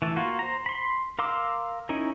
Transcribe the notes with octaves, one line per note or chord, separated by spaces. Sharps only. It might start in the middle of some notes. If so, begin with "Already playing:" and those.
E3 A3 A4
A#3 F4 F#4
C5 A#5
B5 C6
A#4 F5 C6 D6 E6
C#4 D#4 E4 A#4